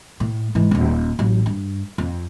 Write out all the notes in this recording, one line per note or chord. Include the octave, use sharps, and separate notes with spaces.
A2
G#2 E3
D#1 G#1
A1 F#3
G2
F2